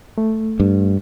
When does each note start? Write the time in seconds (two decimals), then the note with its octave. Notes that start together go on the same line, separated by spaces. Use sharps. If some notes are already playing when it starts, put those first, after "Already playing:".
0.18 A3
0.60 G2